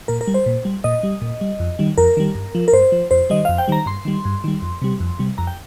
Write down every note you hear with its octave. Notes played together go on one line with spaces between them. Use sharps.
A#2 A#4
A#4
G3
C5
A#2
G3
A#2 D#5
G3
A#2
G3
F2
D#3 G3
F2 A#4
D#3 G3
G2
F3
A#4
G2 C5
F3
F2 C5
D#3 G3 D#5
F2 F5
G5
D#3 G3 A#5
G2 C6
D#3 G3
G2
D#3 G3
F2
C3 G3
F2
C3 G3
F2 A#5
G5